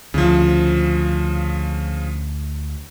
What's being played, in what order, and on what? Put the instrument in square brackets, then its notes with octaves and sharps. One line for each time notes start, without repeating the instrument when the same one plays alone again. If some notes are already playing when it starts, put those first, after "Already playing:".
[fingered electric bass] D2 [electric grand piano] C#3 F3